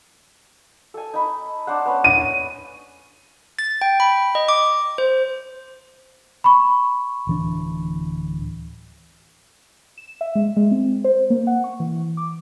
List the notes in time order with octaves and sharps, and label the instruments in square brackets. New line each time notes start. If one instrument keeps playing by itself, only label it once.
[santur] A4 G#5
D#4 B5
D4 C5 F#5
B3 C#4
[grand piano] D#7
[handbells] A6
G5
B5
D#5
D6
C5
[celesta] B5 C#6
[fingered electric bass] D1 E3 D4
[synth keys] E7
E5
G#3
G#3
C4
C5
A#3
F#5
C#6
E3
D6